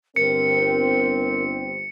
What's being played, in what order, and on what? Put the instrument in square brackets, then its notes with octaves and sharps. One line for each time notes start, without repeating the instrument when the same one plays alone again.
[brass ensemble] G1 C4 [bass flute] A#4 [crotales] C#7